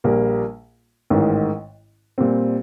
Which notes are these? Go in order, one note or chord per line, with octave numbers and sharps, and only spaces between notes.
A#1 A#2 G3 A#3
A1 G#2 D#3
A#2 G3 C4